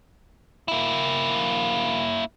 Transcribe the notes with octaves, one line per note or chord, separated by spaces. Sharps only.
A#3 E4